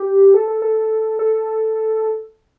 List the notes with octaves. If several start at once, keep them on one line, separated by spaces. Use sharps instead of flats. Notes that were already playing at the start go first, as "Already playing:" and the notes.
Already playing: G4
A4
A4
A4
A4